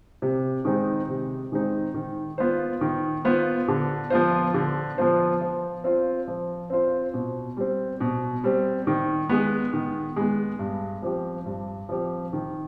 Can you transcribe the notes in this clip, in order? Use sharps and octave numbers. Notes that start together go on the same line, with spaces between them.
C3
D#3 G#3 C4 D#4
C3
D#3 G#3 C4 D#4
D#3
B3 F4 C5
D#3
B3 F4 C5
D3
F3 B3 F4 C5
D3
F3 B3 F4 C5
F3
C4 F4 C5
F3
C4 F4 C5
B2
G3 C4
B2
G3 C4
D#3
G#3 B3
D#3
G#3 B3
G2
F3 C4 G4
G2
F3 C4 G4
D#3